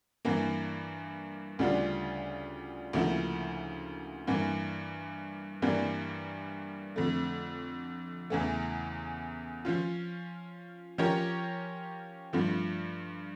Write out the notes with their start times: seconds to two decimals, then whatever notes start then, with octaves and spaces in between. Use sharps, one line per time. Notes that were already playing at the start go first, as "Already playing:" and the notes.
0.25 G2 E3 A#3
1.59 D2 C#3 G3 D4 F4
2.93 D2 C#3 F3 A#3 E4
4.27 G2 E3 A#3
5.62 G2 E3 G3 A#3
6.96 F2 D3 A3
8.30 E2 C#3 E3 A3
9.65 F3 C#4 F4
10.98 F3 C#4 G4 A#4 C#5
12.33 G2 F3 A3